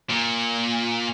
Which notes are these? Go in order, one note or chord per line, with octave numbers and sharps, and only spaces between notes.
A#2